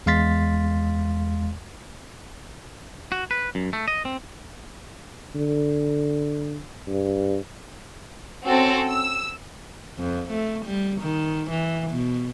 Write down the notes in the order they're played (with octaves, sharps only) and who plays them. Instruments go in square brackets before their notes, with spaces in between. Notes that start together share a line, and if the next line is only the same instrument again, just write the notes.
[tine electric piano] E2 G#3 F5 C6 A6 B6
[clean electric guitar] F#4
B4
F#2
A3
D#5
C4
[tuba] D3
G2
[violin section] C4 C#4 F#4 A4
E6
[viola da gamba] F2
A3
G3
D#3
E3
B2